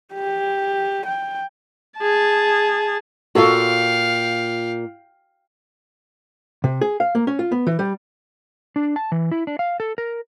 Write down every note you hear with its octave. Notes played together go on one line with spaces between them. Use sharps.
G4
G5
G#4 A5
A#2 F4 F#4 A4 F5 G5
C3
G#4
F5
A#3
C#4
F4
B3
E3
G3
D4
A5
E3
E4
D4
F5
A4
A#4